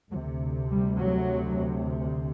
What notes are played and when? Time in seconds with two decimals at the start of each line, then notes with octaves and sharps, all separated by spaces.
0.11 D2 F#3
0.15 C3
0.71 G3
1.01 F#3